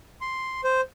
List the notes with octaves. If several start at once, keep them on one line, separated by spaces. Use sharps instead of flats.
C6
C5